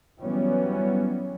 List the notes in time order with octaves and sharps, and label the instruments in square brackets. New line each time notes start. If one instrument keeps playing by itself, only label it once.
[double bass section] E3 F#3 G3 B3 C#4